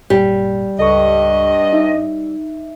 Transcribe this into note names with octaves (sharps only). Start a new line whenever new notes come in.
G#1 F#2 A#2 G3
C#2 G2 A4 D#5 C#6
D#4 E5